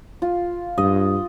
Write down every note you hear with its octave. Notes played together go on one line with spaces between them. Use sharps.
F4
G2 D#5